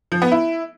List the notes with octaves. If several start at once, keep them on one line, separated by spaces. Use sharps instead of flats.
F3
B3
E4